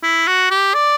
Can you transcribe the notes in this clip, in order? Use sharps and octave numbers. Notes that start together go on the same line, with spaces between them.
E4
F#4
G4
D5